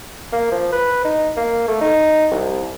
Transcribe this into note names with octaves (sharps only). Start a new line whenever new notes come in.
A#3
F3
B4
D#4
A#3
A3
D#4
C2